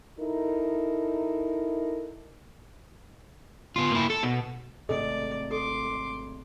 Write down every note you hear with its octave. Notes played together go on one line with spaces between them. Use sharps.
D#4 E4 A4 A#4
B3 F4
A#3 E4
A4
B2
G#1 C3 A3 G#4 A4 D5 D#5
A4 C6 D6